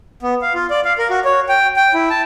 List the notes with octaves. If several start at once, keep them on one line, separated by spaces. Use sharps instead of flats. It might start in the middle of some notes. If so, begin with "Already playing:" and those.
B3
F5
F4
D5
F5
A#4
F#4
C#5
G5
G5
E4
A5